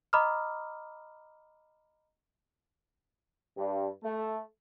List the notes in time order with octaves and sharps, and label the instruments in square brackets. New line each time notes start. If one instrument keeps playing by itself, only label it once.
[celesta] D#5 A#5 B5 D6 D#6 F6
[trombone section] G2
A3